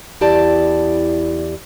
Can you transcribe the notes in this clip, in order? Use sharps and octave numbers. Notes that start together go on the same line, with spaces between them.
E2 E4 G4 D5 A5